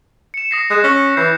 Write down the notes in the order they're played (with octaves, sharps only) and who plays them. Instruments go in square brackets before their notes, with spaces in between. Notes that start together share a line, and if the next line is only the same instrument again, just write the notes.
[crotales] C#7 E7
D#6 A#6 C7
[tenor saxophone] G#3 [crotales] F#6 E7
[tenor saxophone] C#4 [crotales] A#6
[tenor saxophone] E3 [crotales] G6 C7